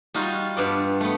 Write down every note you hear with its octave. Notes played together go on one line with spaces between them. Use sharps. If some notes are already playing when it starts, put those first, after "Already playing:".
G3 D#4 F4 F#4
G2 B3 D5
A3 B3